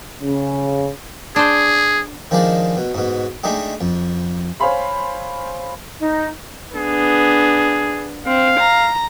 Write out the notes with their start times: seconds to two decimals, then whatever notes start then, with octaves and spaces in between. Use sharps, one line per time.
0.21 C#3
1.36 D4 G#4 C5
2.31 D#3 F3 G#3 D4 D5
2.77 B2
2.95 G#2 B2
3.44 G#3 A3 D4 D#4 G4
3.81 F2
4.60 C5 C#5 F5 G#5 B5 C6
6.01 D#4
6.75 B3 D4 G#4
8.26 C4 F5
8.59 A#5